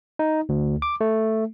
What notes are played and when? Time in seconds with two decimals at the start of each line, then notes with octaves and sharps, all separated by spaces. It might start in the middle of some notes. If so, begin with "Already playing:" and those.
0.19 D#4
0.49 D2
0.82 D6
1.01 A3